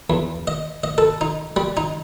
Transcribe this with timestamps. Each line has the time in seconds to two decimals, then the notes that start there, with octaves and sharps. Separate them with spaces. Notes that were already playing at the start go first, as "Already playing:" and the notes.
0.10 E2
0.47 D#5
0.84 D#5
0.98 A4
1.21 D#4
1.56 G3
1.77 D#4